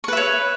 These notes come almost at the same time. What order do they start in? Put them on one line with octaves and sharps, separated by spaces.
C#6 B4 E5 C#5